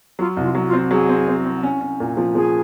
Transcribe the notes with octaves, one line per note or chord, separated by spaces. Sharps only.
F#3 F4
C2
F4
F#3
F4
C4
F#3 G#4
C4
C4
C4
C#4
C#4
A#2
F3
F3 G#4